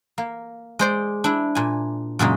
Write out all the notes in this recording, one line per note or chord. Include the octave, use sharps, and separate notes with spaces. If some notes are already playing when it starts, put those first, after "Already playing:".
A#3
G#3 C5 D5
D4 E4
A#2 G#5
F#2 A#2 C#3 G#3